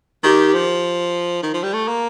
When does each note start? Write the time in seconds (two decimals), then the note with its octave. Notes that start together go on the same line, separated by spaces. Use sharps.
0.23 D#3 G4
0.54 F3
1.43 D#3
1.53 F3
1.63 G3
1.73 A3
1.88 A#3